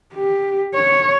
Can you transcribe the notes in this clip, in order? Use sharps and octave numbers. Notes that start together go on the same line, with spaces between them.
G4
C#5